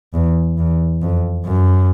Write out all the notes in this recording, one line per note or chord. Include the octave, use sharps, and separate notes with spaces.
E2
E2
F2
F#2